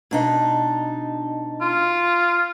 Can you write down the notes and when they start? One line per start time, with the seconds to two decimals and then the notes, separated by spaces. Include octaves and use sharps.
0.11 B2 D4 D#4
1.61 F4